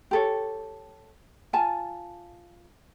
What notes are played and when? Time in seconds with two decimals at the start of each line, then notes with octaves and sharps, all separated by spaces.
0.11 G4 A4 C#5
1.53 F4 G#5 A5